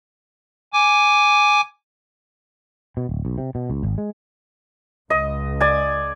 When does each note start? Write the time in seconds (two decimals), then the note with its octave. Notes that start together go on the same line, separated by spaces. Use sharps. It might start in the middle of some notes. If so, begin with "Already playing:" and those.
0.73 G#5 D6
2.97 B2
3.09 D1
3.25 B1
3.38 C3
3.55 B2
3.70 C#2
3.83 G#1
3.98 G#3
5.10 C#2 D#5
5.61 D5 G#5